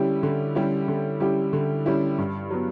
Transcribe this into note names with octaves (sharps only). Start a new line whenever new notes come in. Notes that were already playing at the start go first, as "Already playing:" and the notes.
Already playing: D3 G3 C#4 E4 G4
D3
G3 C#4 E4 G4
D3
G3 C#4 E4 G4
D3
G3 C#4 E4 G4
G2
F#3 B3